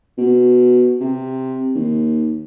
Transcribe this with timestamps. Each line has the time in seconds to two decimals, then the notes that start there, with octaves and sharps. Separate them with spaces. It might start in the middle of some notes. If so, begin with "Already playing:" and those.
0.18 B2
1.01 C3
1.75 D#2